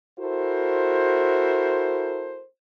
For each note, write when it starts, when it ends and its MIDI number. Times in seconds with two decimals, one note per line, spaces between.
0.20 2.43 64
0.20 2.43 66
0.20 2.43 69
0.20 2.43 70
0.20 2.43 72